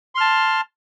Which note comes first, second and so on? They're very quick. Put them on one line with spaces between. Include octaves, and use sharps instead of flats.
C6 F6 A5